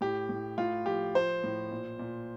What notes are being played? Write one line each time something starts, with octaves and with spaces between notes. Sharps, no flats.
A2 G4
A2
A2 F4
F3 G4
F3 C5
A2
A#2
A#2